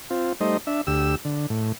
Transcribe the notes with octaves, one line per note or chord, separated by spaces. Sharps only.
C4 F4
G3 A3 D#4 C5 D#5
D4 E5
D2 G4 E6
D3
A2